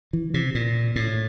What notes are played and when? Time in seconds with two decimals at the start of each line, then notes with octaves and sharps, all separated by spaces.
0.13 E3
0.34 C3
0.55 A#2
0.96 A2